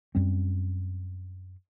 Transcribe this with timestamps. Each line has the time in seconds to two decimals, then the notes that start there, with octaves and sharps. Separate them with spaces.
0.15 F#2 G3 C4